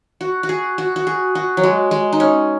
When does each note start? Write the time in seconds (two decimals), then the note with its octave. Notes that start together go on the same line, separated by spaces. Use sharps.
0.21 F#4
0.43 F#4
0.49 G#4
0.78 F#4
0.96 F#4
1.07 G#4
1.35 F#4
1.57 F#3
1.63 G#3
1.91 G#3
2.12 D#4
2.20 C#4